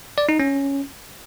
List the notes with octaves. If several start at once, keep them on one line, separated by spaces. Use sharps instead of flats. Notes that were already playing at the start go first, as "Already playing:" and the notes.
D5
D#4
C#4